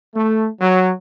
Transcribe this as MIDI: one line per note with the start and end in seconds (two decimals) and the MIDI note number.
0.15 0.48 57
0.61 0.92 54